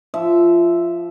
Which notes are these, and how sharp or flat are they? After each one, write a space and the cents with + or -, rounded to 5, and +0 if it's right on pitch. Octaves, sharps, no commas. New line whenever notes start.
F3 -15 E5 +0